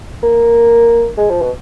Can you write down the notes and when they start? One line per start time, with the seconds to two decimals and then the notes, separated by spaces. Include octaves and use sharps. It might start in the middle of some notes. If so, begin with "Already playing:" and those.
0.23 A#3
1.18 G#3
1.30 F3
1.42 B2